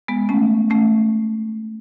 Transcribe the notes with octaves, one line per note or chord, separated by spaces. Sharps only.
G#3 B3
A3 C#4
A3 C#4